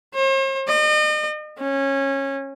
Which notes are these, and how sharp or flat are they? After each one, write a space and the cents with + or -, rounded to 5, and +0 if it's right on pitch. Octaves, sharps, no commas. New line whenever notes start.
C5 +45
D#5 -40
C#4 -20